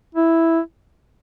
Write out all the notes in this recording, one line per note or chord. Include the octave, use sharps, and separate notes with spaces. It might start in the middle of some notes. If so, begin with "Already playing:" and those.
E4